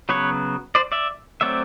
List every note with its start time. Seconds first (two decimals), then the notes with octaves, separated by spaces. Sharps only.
0.09 C#3 F#3 B3 B4 C#5
0.75 C5 D5
0.92 D5 E5
1.41 F#3 A3 C4 D5 E5